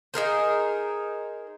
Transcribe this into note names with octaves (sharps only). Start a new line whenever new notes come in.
D#4 G#4 A#4 C5